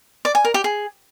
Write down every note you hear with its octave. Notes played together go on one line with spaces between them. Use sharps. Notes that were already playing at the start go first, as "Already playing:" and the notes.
D5
G#5
A#4
G4
G#4